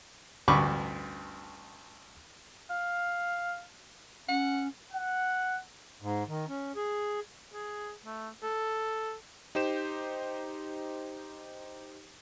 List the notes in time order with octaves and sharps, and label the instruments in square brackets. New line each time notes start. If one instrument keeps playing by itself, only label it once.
[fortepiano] A1 D2 G2 B5 C#6 D6
[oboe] F5
[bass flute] C#4 [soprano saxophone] F#5
[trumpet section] F#5
[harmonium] G#2
D#3
C#4
G#4
[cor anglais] G#4
A3
A4
[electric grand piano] D#4 G4 C5 E7